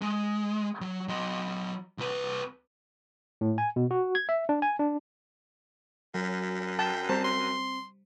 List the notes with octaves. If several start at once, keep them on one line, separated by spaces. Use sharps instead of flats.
G#3
F#3
F#3 D#5
C2 B4
A2
G#5
B2
F#4
G#6
E5
D4
G#5
D4
F#2 F#3
G5 A5
G3 C4 C5 A5 A#5
C6